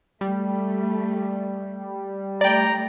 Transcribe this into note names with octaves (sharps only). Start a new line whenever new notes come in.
G3 A3
A3 D5 G5 A#5